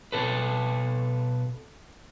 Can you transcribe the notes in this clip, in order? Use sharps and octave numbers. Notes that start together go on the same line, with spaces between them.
B2 A4 B4